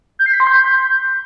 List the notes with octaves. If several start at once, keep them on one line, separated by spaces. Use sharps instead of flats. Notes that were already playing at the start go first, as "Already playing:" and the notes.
G6
C7
B6
C6
G6